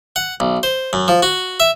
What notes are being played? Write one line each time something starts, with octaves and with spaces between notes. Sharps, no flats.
F#5
B1
C5
F#2
F3
F#4
E5